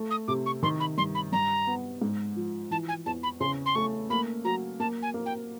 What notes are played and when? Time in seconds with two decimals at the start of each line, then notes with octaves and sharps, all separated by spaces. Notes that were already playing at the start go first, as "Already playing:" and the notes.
Already playing: A3
0.11 D#6
0.28 C3 D6
0.46 C#6
0.63 D#3 C6
0.80 B5
0.98 G2 C6
1.15 B5
1.32 G2 A#5
1.67 B3
2.01 G#2
2.36 F3
2.71 E3 A5
2.88 G#5
3.06 E2 A5
3.23 B5
3.40 C#3 C6
3.66 C6
3.75 A3 C#6
4.10 A#3 B5
4.45 F#3 A#5
4.80 A#3 A5
5.02 G#5
5.14 A#3
5.26 G5